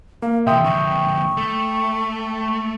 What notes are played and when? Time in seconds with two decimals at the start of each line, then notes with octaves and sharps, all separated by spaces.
0.22 A#3 F5
0.47 C3 E3 E5 G5 C6 D#6
0.64 F2 D3 C#6
1.37 A3